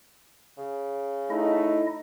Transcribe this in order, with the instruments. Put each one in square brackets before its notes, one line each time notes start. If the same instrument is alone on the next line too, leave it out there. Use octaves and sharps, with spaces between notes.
[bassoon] C#3
[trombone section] A3 D#4 [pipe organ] E4 D#5